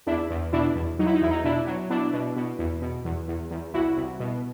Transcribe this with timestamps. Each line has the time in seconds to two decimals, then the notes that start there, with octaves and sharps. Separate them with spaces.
0.07 E2 D4 E4
0.30 E2
0.53 B2 D4 E4
0.76 E2
0.99 F#3 D#4
1.06 E4
1.15 D#4
1.21 E2 E4
1.31 D#4
1.44 B2 D4 E4
1.67 F#3
1.90 B2 D4 E4
2.13 B2
2.37 B2
2.59 E2
2.82 B2
3.05 E2
3.28 E2
3.51 E2
3.74 C2 E4 F#4
3.97 C2
4.20 B2